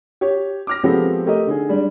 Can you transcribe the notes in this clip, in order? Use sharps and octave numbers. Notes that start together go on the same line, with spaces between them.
G4 C#5
D6 F6 A#6
F3 G#3 B3 C4 G4 A4
A3 G4 A#4 D#5
D3 D#4 G#4
G3 G#3 D4